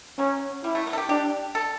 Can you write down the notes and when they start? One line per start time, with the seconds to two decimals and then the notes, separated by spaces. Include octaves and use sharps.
0.18 F#3 C#4
0.64 G3 E4
0.75 A3
0.87 B3
0.93 A4
0.98 G4
1.09 D4 G4
1.55 A4